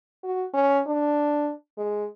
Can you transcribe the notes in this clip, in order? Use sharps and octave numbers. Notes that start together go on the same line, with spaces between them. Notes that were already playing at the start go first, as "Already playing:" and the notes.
F#4
C#4
D4
G#3